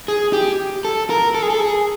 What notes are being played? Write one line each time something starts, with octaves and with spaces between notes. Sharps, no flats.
G#4
G4
A4
A#4
A4
G#4
A4
G#4